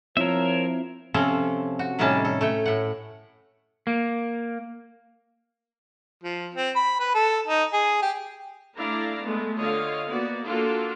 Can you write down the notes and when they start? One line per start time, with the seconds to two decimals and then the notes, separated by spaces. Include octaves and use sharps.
0.17 F3 C4 E4 A#4 C#5 E5
1.14 C3 F3 C4 C#4 A4
1.79 F#4
1.99 A2 C3 D#3 G3 C#4 A5
2.25 A4
2.41 A3 C#5 G5
2.66 A2 F#5
3.87 A#3
6.24 F3
6.55 C4
6.76 B5
7.00 B4
7.15 A4
7.48 D#4
7.73 G#4
8.02 G4
8.75 A3 D4 E4 D5 F5 A#5
9.22 G#3 A3 B3
9.57 D3 F4 C#5 D#5 F5
10.08 A#3 B3 F#4 D5
10.45 A#3 D4 F4 F#4 A4